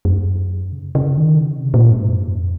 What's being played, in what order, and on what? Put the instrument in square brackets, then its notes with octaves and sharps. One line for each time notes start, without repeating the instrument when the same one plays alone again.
[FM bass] F#2
C#3
C#3
D#3
C#3
C3
A#2
G#2
F#2
F2